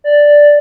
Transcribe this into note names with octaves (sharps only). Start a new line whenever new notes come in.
D5